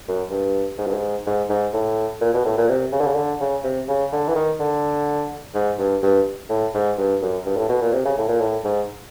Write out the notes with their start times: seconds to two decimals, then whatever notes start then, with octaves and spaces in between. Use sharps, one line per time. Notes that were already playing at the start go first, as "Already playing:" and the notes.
0.08 F#2
0.31 G2
0.78 G#2
0.86 G2
0.94 G#2
1.26 G#2
1.50 G#2
1.73 A2
2.21 A#2
2.33 B2
2.45 A2
2.58 A#2
2.69 C3
2.92 C#3
3.00 D3
3.07 C#3
3.16 D3
3.40 C#3
3.64 C3
3.88 C#3
4.12 D3
4.28 E3
4.35 D#3
4.59 D3
5.54 G#2
5.79 G2
6.02 G2
6.50 A2
6.74 G#2
6.98 G2
7.21 F#2
7.45 G2
7.57 A2
7.69 B2
7.81 A#2
7.93 C3
8.05 C#3
8.17 A2
8.28 A#2
8.40 A2
8.64 G#2